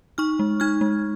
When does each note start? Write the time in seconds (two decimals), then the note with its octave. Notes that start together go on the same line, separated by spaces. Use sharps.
0.18 D#4 C#6 F6
0.39 G#3
0.60 D#4 F6 G#6
0.81 G#3